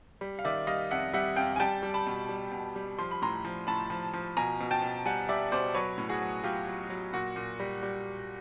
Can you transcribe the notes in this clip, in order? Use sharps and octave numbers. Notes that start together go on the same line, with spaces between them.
G3
F5
D#3 D5 E5
G3 D#5 F5
F2 E5 F#5
G3 E5 F#5
F2 F5 G5
G#5
G3 G5 A5
G3
A5 B5
B2
G3
B2
G3
F3 C6
B5
A2 A#5 C6
F3
A2 A5 B5
F3
F3
B2 G#5 A#5
B2
G5 A5
B2
G3 F#5 G#5
G3 D5 E5
B2 C5 D5
F#3 B4 C#5
A2
F#4 G#4
F#3
F#3 F4 G4
F#3
F#3
A#2 F#4
A#2
G3
G3